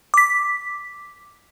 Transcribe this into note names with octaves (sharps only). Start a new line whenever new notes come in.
D6 B6